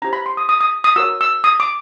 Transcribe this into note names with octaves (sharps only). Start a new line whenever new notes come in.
C#4 E4 G4 C5 A#5
B5
C6
D#6
D#6
D#6
D#6
F#4 A#4 C#5 E6
E6
D#6
D6